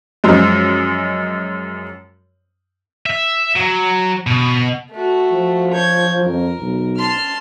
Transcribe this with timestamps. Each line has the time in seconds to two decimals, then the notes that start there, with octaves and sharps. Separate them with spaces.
0.24 F#2 F3 G#3
3.06 E5
3.56 F#3
4.27 B2
4.92 A3 F#4
5.31 F3
5.72 C#5 G6 G#6
6.25 F2 A#4
6.59 B1
6.97 A5 C6 F6